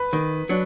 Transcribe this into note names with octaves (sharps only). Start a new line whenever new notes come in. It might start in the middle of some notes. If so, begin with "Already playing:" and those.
Already playing: B4
D#3
F#3 D4